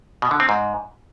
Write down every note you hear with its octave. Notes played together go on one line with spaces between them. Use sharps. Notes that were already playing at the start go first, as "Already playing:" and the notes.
B2
D3
C4
G#2